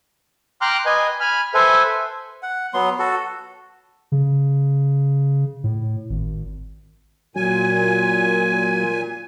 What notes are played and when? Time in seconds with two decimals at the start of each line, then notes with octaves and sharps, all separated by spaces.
0.61 G5 A#5 C6 D6 F6 F#6
0.86 B4 D#5 G#5
1.20 G#5 B5 F6
1.54 A4 B4 C5 E5 G#5
2.43 F#5
2.74 F#3 B3 C6
2.99 F#4 A4
4.12 C#3
5.64 A2
6.10 G#1
7.36 A#2 F#3 G#5